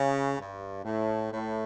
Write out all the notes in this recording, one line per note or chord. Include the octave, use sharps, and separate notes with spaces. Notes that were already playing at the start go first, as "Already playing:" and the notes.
Already playing: C#3
G2
A2
A2